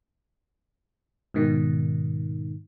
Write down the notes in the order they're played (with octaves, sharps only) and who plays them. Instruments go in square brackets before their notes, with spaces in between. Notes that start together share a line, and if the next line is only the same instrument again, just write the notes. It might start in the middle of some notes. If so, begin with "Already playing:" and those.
[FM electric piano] G#2 B2 D#3